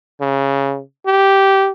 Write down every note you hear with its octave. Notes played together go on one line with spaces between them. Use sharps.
C#3
G4